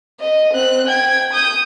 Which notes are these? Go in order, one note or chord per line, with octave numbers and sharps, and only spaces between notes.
D#5
C4 F#6
G5 G#6
D#6 G6